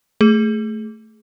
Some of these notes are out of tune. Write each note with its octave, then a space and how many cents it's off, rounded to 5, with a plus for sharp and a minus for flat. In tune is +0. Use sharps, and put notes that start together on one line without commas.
A3 +0 G#4 +0